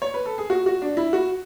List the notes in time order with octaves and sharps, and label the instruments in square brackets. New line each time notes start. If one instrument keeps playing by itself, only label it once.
[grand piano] C#5
B4
A4
G#4
F#4
F#4
D4
E4
F#4